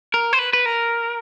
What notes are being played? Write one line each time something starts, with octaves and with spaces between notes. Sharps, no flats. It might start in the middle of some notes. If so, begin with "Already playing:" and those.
A#4
C5
B4
B4
A#4